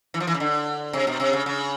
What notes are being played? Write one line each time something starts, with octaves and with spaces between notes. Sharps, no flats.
E3
F3
E3
C#3
D3
C3
B2
C3
C#3
C#3